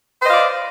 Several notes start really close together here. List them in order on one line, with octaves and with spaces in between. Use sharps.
C5 B4 D#5 F5 D5